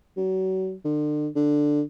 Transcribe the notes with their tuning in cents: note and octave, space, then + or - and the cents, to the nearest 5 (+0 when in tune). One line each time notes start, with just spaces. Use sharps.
F#3 +30
D3 +40
D3 +5